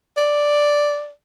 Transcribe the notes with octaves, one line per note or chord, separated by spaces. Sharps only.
D5